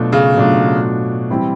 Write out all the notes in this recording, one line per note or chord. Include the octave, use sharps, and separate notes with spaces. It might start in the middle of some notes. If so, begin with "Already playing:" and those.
Already playing: B2 F#3 A3 D4 F4
C#3
B2 F#3 A3 D4 F4
E3 G3 C4 E4 G4